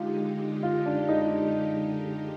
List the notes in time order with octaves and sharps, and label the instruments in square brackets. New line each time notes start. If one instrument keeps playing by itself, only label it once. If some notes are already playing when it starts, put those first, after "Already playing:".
Already playing: [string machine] D3 G#3 D#4 G4 [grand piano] F4
[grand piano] F4
D4
D#4